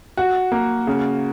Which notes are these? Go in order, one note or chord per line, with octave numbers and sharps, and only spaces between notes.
F#4
A#3
C#3